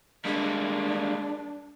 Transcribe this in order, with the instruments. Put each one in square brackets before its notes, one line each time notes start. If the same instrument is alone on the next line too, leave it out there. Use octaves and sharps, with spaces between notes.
[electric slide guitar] G3 G#3 A#3 [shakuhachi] D4